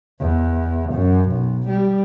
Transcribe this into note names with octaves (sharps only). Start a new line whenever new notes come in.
E2
F#2
B1
G3